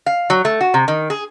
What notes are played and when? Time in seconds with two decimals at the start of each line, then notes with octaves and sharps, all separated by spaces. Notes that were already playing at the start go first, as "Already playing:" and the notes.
0.06 F5
0.30 F#3
0.45 A3
0.61 F#4
0.74 C3
0.88 D#3
1.10 G#4